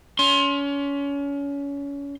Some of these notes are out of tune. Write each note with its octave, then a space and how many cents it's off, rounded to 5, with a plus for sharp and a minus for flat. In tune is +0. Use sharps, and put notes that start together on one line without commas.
C#4 +30 C6 +25